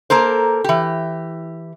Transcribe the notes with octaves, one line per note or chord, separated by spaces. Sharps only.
A#3 A4 A#4 C5
E3 G4